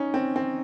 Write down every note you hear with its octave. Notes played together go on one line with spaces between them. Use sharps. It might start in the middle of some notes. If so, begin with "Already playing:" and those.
Already playing: C#4 D#4
C4
C4